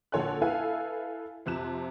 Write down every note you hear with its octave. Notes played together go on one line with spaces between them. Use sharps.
A#1 D3 A4 C#5 G#5 F#6
E4 A4 B4 E5 F5 G#5
F2 C3 F#6 E7